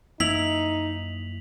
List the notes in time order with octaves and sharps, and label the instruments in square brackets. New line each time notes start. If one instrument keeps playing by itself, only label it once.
[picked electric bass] F#2 F3 A#3 [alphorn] D#4 [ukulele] E4 [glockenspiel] B6 F7 F#7